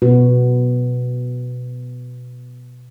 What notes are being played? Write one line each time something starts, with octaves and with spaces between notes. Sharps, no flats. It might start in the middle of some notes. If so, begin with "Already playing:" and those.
B2 F#4 B4